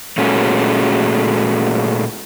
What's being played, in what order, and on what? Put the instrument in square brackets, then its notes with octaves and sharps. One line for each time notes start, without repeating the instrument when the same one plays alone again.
[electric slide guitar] A#2 G#3 A3 C#4 F#4